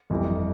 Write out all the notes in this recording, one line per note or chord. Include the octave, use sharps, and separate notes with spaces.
G1 F2 E3 G3